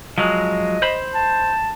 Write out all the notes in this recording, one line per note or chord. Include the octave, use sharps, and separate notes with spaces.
F3 F#3 G#3 D#5
C5 B5
A5